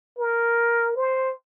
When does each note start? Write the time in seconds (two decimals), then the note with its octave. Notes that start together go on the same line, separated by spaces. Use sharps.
0.18 A#4
0.96 C5